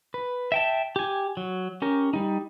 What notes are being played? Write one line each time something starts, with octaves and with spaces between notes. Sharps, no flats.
B4
E5 G5 A5
G4 G#5
F#3
C#4 G4 A#4
G3 D#4